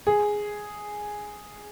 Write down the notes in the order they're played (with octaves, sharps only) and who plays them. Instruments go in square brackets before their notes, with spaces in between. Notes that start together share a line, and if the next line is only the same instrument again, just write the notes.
[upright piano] G#4